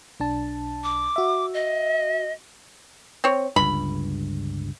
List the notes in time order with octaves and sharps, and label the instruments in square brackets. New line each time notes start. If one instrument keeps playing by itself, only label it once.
[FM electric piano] B1 D4 A5
[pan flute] D6
[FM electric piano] F#4 E5
[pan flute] D#5
[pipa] C4 C#5
[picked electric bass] G1 C#2 G2 [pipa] B5